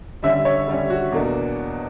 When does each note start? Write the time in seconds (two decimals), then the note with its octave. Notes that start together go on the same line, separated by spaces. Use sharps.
0.23 D3 G3 C#4 E5
0.45 C#5
0.67 D3 G3 C#4
0.90 F#4
1.12 E2 B2 A#3 D4